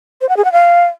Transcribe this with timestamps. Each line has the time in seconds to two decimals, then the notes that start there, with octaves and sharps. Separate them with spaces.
0.21 C5
0.29 F#5
0.37 G#4
0.45 F#5
0.52 F5